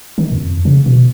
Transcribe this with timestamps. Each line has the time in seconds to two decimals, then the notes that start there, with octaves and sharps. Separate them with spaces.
0.18 D#3
0.32 F2
0.65 C#3
0.86 B2